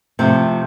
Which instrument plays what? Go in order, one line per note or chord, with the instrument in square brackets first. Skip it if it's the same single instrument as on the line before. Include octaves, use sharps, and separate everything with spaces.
[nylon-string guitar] C3 F3 A3 C4